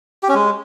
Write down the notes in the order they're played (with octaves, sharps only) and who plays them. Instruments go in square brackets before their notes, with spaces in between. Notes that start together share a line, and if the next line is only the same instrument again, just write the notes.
[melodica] G4
C#4
G#3